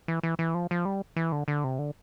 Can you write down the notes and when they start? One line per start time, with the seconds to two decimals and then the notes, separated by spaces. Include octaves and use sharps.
0.08 E3
0.23 E3
0.39 E3
0.55 F3
0.71 F3
0.85 G3
1.16 E3
1.32 D3
1.48 D3
1.64 C3
1.79 D3